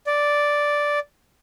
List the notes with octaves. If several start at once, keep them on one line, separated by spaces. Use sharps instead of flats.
D5